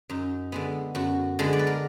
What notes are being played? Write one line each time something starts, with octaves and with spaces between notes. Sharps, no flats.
F#2 D#4
D3 G#3 B3
F#2 F#4
D3 G#3 B3
D5
B4
A#4